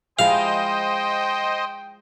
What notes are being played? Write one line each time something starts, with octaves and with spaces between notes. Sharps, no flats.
F3 G#3 E4 C5 D#5 F5 G5